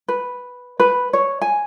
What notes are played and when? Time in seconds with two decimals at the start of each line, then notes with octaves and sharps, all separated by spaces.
0.08 B4
0.79 B4
1.13 C#5
1.41 G#5